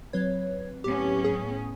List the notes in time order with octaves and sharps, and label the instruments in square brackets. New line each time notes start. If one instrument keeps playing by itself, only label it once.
[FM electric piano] F#3 C4 B4 [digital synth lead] C#5
[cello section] A2 B3 C#4 [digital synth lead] G4
[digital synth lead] G#4